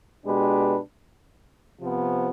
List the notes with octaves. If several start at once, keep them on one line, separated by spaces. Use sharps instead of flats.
B2 G#3 D4 G4 B4
C3 F3 B3